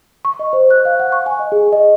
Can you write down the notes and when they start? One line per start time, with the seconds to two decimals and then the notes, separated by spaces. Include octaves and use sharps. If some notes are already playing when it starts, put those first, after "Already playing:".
0.25 C#6
0.39 D#5
0.53 C5
0.70 F#6
0.85 F5
1.00 F#5
1.12 C#6
1.26 G#5
1.39 D#5
1.52 G#4
1.73 D#5